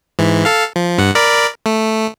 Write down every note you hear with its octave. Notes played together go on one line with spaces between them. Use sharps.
G#2 E3
A4 F5
F3
G2 F#5
A#4 D5 B5
A3